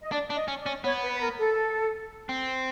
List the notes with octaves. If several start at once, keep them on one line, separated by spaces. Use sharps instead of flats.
D#5
D4 D5
D4
D#5
C#4
D5
C#4
B3 C#5
B4
B4
A#4
A4
C4